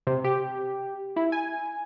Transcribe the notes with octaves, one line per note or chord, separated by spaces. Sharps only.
C3
G4
E4
G#5